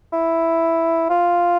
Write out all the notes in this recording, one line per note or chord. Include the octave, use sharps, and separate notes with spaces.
E4
F4